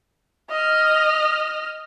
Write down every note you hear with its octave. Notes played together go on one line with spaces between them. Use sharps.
D#5 F6